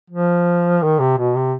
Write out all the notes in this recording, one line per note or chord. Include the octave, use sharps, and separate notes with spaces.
F3
D#3
C3
B2
C3